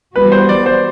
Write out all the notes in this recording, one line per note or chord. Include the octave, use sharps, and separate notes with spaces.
E3 G3 B3 F#4 B4
C5
D5
C5